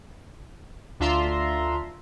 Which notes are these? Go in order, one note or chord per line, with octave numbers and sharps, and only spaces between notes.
D2 D4 F4 E5 A#5 C6